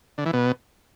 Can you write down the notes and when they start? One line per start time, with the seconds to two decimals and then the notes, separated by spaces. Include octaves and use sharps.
0.18 D3
0.26 E3
0.33 B2